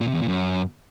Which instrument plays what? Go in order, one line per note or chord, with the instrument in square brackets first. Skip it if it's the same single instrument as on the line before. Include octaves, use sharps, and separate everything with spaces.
[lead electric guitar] A#2
C3
E2
A#2
F#2